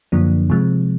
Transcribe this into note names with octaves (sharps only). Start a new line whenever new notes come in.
F#2 D3 F3 A#3 D4
C3 F3 G#3